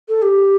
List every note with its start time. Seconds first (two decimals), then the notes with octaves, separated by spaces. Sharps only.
0.08 A4
0.22 G4